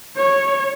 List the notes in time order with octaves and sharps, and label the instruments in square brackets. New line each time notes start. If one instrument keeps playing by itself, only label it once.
[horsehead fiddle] C#5